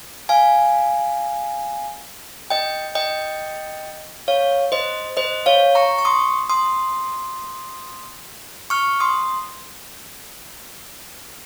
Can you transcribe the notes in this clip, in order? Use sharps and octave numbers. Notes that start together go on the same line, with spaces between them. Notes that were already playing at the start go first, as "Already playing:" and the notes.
F5 G#5
D#5 G5
D#5 G5
C#5 F5
C5 D#5
C5 D#5
C#5 F5
A#5 C#6
C#6
C6 D#6
C6 D#6
C#6 F6
C6 D#6